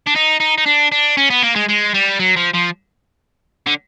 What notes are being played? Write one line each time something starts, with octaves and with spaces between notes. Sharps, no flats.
D4
D#4
D#4
D#4
D4
D4
C#4
B3
A#3
G#3
G#3
G3
F#3
F3
F3
D3